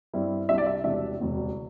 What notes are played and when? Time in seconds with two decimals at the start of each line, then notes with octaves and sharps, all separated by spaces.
0.13 G2 G3 C4 E4
0.49 C2 C3 G3 D4 E5
0.58 D5
0.66 E5
0.84 E1 E2 C3 G3 D4 E5
1.19 E1 D2 C3 G3